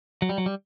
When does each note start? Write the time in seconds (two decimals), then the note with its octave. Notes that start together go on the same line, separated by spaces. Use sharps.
0.22 F#3
0.29 G3
0.38 F#3
0.46 G3